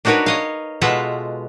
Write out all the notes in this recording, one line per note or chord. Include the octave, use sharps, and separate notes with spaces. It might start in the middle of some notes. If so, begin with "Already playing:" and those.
D4 D#4 F#4 A#4 B4 C#5
C#5 D#5 F5
B2 G#3 F4 A4 E5 F#5